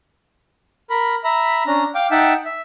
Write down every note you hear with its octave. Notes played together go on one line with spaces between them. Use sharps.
A#4 B5
E5 A#5 B5
C#4 D4 A#5
F5 G5 D6
D#4 E5 F#5 G5 A5
E5